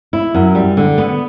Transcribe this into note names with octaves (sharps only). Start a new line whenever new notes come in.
E4
F#2
G3
D3
B3